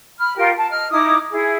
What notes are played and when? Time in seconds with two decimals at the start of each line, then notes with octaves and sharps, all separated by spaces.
0.19 B5 F6
0.36 F4 G4 A#4 G5
0.56 A5
0.69 D#5 F6
0.91 D#4 E4 D6 D#6
1.30 E4 G#4